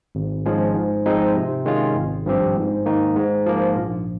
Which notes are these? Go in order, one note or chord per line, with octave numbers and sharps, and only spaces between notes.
G#1
G#2 F3 G#3 C#4
G#2
F3 G#3 C4 D#4
C3
D#3 G#3 C#4 F4
G#1
G2 F3 C4 G4
G#2
D#3 A#3 D#4
G#2
F3 A#3
A#1